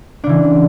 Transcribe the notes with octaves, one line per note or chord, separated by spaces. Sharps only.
C#3 E3 D4